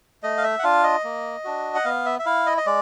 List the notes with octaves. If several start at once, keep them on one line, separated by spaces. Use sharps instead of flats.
A3 D#5
F5
E5
F#5
D4 F4 F5
D#5
A#3
D4 F#4
F#5
B3 F5
E5
E5
E4 F5
D#5
D#5
G#3 D5